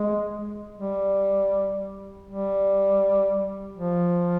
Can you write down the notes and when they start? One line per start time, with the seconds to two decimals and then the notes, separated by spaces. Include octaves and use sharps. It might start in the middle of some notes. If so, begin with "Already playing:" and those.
Already playing: G#3
0.78 G3
2.28 G3
3.77 F3